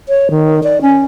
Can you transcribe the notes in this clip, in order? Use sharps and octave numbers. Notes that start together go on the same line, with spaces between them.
C#5
D#3
D5
C#4